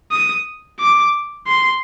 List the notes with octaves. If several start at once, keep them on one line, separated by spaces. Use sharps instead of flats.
D#6
D6
C6